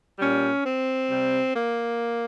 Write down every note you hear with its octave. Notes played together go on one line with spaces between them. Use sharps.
A#2 G3 C#4
C4
C3 G3
A#3